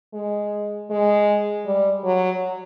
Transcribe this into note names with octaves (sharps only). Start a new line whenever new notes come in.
G#3
G#3
G3
F#3